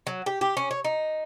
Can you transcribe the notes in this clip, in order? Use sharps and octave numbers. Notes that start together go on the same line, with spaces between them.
F#3
G4
G4
C#4
C#5
D#4